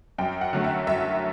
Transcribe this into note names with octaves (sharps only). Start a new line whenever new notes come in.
F#2 G5
F#5
D3 F#3 A3
E5
F#2 E5